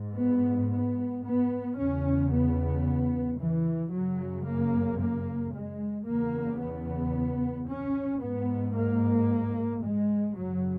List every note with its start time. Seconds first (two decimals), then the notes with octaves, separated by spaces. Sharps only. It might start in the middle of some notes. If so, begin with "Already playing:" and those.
Already playing: G#2
0.17 B3
0.71 B3
1.24 B3
1.77 E2 C#3 C#4
2.31 B3
3.38 E3
3.92 F#2 C#3 F#3
4.46 A#3
5.00 A#3
5.53 G#3
6.06 E2 C#3 A#3
6.60 B3
7.68 C#4
8.21 G#2 B3
8.75 A#3
9.82 G#3
10.35 F#2 C#3 F#3